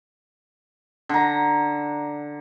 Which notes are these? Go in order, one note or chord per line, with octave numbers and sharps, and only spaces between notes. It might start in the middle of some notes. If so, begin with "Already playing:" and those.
D3 A#5